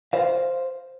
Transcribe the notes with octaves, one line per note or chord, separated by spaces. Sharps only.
C5 F5